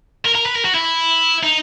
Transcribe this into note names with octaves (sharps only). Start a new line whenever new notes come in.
A#4
A#4
B4
A#4
F#4
E4
D#4